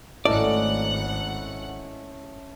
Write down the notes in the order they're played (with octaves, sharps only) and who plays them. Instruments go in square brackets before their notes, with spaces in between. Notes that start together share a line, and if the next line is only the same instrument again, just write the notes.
[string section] G#1 F#5 [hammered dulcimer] A3 C#4 [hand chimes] E4 D#5 [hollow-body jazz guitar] D5